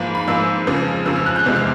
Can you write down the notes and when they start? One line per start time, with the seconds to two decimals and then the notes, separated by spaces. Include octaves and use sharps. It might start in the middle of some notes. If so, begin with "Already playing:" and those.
Already playing: G#2 F3 A#3 B5
0.15 B5
0.27 G#2 F3 A#3 E6
0.67 F2 C#3 F3
1.06 F2 C#3 F3 E6
1.16 F6
1.26 F#6
1.36 G6
1.45 E2 C3 F3 G#3
1.56 F6